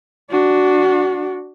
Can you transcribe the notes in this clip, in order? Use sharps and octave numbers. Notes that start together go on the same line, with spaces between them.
D4 F#4